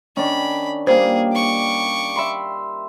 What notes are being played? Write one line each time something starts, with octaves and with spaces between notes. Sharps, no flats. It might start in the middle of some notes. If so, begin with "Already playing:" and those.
D#3 C#4 D4 B5
G3 A#3 G4 G#4 C5
C#6 D6
E5 B5 C6